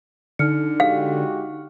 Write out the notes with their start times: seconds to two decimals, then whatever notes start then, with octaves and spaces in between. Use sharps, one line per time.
0.39 D3 D#4 F6 C#7
0.80 G#3 F#4 G4 F5